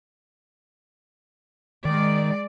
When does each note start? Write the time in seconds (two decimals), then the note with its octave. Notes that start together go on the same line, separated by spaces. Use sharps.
1.85 D#3 G#3 D5